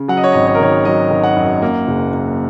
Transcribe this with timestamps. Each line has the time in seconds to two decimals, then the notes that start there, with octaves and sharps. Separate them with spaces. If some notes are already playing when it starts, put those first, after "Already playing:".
Already playing: C#3
0.08 F#3 F#5
0.17 D#5
0.24 C#5
0.32 G#1 D#5
0.47 C#5
0.55 A#4
0.60 D#3 C#5
0.85 F#3 D#5
1.11 D#3
1.24 F#5
1.37 F#2
1.62 A#3
1.87 F#1
2.13 A#3